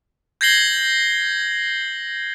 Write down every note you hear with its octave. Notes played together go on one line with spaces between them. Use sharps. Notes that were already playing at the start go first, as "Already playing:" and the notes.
G6 G#6 A#6 C7 F#7 G7